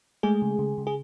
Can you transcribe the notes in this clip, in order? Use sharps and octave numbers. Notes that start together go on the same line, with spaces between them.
G#3 A3 G#4
C#3
C#3
C#3
G#4